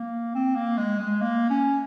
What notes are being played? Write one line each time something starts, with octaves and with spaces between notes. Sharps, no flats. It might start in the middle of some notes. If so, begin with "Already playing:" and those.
Already playing: A#3
C4
A#3
G#3
G#3
A#3
C#4